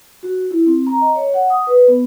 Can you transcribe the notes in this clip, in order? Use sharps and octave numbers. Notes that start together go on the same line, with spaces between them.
F#4
E4
C4
A#5
D#5
C#5
F#5
D#6
B4
B3